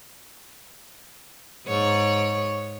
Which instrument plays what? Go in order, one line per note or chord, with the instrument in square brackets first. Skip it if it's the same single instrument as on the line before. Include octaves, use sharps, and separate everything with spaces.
[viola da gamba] G#2 C#5